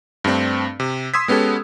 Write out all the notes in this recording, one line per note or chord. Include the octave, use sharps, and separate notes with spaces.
G2 A3 C4 D4
C3
C6 D#6 E6 G#6 B6
G#3 B3 C#4 G4 A4